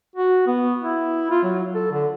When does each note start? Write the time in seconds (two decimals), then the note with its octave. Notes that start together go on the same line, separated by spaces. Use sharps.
0.16 F#4
0.47 B3
0.83 E4
1.31 F4
1.43 F#3
1.75 A4
1.92 D3